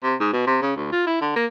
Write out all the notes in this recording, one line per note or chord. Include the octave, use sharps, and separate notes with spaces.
C3
G#2
B2
C3
C#3
D2
F4
E4
D3
A#3